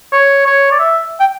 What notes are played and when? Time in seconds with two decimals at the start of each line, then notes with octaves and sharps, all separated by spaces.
0.12 C#5
0.46 C#5
0.71 D5
0.79 E5
1.20 G5